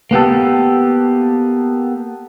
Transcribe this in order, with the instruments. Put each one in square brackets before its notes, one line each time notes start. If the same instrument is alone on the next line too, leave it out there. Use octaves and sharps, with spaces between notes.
[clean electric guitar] A#3 B3 G4 A4